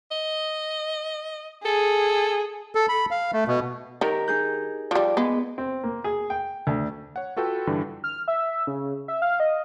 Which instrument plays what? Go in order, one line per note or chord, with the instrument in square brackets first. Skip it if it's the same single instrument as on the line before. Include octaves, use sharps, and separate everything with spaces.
[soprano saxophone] D#5
[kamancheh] G#4 [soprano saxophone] A4
[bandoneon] A4
B5
F5
A3
B2
[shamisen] D#3 [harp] G4 A#4
[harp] D#4 G#4 G6
[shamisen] F3 G3 [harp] D6
[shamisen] G#3 [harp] B3
[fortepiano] C4
A#3
G#4
G5
D2
[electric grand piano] C#5 F#5
F4 F#4 A4 B4 F#5 G5
G2 D3 E3
[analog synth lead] F6
E5
C#3
E5
F5
D#5